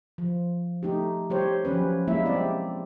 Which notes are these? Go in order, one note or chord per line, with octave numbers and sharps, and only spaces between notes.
F3
A3 D#4 G4
G3 G4 C5 C#5
F3 F#3 C#4 B4
G#3 A#3 E4 E5
G3 C4 D5